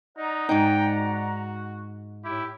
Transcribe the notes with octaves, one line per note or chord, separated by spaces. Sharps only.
D#4 D5 F#5 A#5
G#2 D#4 G5
F#4
A2 E4 G4